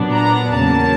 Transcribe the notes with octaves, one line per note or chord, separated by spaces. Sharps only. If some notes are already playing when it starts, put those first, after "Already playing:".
Already playing: A#2 F#3 B3 D4
A#5
E2 C#3 F#3 A#3 A5